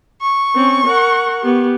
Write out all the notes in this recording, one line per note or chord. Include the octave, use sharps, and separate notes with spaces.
C#6
C4 C#4
A#4 F#5
B3 G4